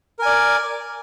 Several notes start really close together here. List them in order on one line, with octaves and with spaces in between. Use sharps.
A#4 G#5 D5